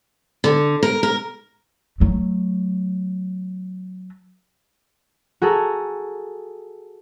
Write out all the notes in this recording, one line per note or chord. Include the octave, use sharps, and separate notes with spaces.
D3
A#4
A#4
F#3 A3
F#4 G#4 A4 A#5